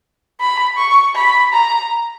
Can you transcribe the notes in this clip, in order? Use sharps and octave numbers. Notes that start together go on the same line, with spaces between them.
B5
C#6
B5
A#5